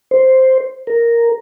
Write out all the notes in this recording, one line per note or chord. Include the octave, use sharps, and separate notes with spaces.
C5
A#4